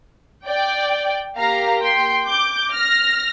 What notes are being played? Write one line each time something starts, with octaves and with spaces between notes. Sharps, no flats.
D5 G5
A#3 G4 F5 A#5
G5 C6
D6 G6
F6 A#6